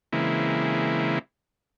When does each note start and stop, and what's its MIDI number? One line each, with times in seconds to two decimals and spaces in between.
0.13 1.19 49
0.13 1.19 52
0.13 1.19 56
0.13 1.19 58
0.13 1.19 60
0.13 1.19 64